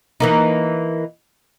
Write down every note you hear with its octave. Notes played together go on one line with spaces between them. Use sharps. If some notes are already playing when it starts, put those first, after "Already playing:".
E3 A#3 D#4